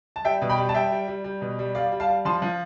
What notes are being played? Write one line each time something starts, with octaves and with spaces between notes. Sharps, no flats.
A5
G3 E5 G5
B2
G5 B5
G3
A5
G3 E5 G5
G3
G3
G3
B2
G3
G3 D5 F5
G3
F5 A5
G3
F3 A5 C6
F3